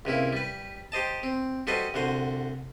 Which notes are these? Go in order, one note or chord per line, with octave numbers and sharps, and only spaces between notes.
C#2 C3 A#3 E4
G3 B4
G4 C5 D#5 A5
C4
G3 F#4 A4 B4 C5 D#5
C2 D3 F#4 C5